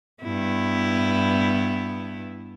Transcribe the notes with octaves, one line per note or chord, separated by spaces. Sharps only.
G2 B3 E4